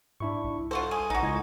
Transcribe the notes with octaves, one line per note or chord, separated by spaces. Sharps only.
G#2 D4 E4 C#6
C2
F4 F#4 A4 C5
G#4
A#1 D#4 F#4
C#2 E4 D#5 G#6